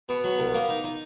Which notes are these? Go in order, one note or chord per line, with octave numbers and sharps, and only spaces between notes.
B2 B3
F#3
C2
A#3
D#4
D#4